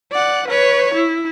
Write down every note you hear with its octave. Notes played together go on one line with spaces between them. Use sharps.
D5 F#5
B4 C#5
E4